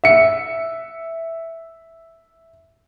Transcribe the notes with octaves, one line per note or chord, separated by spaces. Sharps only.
E5 C#7